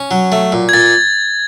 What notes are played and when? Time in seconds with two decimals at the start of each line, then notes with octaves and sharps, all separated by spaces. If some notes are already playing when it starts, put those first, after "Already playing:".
Already playing: C#4
0.11 F#3
0.32 A3
0.52 A#2
0.69 G#6
0.73 A#2 A6